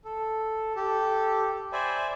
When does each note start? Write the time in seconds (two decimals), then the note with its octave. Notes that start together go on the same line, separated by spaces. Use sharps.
0.05 A4
0.76 G4 A4
1.73 C5 D5 E5 G#5 B5